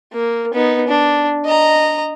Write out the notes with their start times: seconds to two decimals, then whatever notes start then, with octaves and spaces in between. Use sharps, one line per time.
0.13 A#3
0.53 B3 D#4
0.87 D4
1.45 D#5 A#5